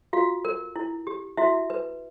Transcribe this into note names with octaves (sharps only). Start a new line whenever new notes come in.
F4 F#4 F5
A#4
E4
G4
E4 F#4 E5
B4